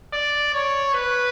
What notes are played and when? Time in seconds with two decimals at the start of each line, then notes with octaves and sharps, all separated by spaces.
0.13 D5
0.54 C#5
0.94 B4